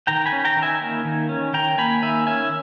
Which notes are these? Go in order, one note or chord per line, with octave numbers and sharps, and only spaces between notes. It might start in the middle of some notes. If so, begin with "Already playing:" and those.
D#3 G5 A#5
G#5 B5
C#4
G5 A#5
D#3
E5 G#5
A#3
D#3
C#4
D#3 G5 A#5
A#3 G#5 B5
D#3 E5 G#5
C#4 E5 G#5